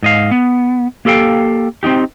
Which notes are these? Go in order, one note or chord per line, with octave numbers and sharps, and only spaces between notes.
G#2 D#5 F5
B3
A#3 G4 A4 F5 G5
C4 C#4 D#4 G4